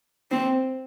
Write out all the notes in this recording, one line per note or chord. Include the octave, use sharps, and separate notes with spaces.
C4